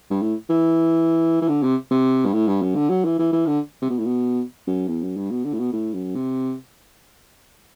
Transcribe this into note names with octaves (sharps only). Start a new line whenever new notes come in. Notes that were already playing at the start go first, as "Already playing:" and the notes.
G2
A2
E3
E3
D3
C3
C3
G2
A2
G2
F#2
D3
F#3
E3
E3
E3
D3
C3
B2
A2
B2
F#2
E2
F#2
G2
B2
D3
A2
B2
A2
F#2
C3